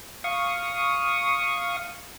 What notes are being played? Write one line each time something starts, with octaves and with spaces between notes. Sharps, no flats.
F5 C#6 D#6